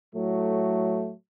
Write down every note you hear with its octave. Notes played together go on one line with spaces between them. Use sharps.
A2 F#3 A3